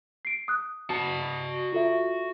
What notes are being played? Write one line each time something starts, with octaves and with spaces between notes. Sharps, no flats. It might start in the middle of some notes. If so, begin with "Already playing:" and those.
C7 D7
D#6 F#6
F#4 A5
F4 A4 E5